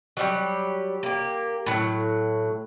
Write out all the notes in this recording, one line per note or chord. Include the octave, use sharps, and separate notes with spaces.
F#3 G3 G4
A#3 G4
A2 F#3